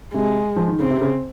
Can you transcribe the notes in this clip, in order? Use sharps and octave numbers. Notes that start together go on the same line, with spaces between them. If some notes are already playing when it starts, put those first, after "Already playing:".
C3 G#3
F3
D#3
C#3 C4
C3
C#3